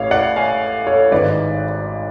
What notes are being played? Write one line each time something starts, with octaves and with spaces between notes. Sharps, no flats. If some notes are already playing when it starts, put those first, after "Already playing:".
Already playing: A1 A2 C#5 F5
D5 F#5
F5 G#5
A4 C#5
G#1 G#2 B4 D5